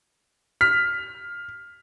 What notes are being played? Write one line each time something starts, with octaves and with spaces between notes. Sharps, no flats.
F6 B6